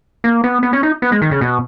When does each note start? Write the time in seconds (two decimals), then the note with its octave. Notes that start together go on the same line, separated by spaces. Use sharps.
0.24 A#3
0.44 B3
0.63 B3
0.73 C#4
0.83 D#4
1.02 B3
1.12 G#3
1.22 D#3
1.31 C#3
1.41 B2